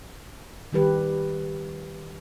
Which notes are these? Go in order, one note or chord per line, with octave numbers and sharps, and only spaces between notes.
D#3 G3 G4 B4